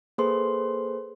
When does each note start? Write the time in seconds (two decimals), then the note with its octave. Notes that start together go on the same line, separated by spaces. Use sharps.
0.18 A#3 G#4 A4 B4 C5 C6